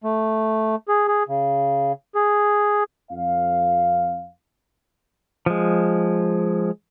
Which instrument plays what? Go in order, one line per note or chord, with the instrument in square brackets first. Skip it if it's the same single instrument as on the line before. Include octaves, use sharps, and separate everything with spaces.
[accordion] A3
G#4
G#4
C#3
G#4
[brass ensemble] F2 F5
[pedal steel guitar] F3 G#3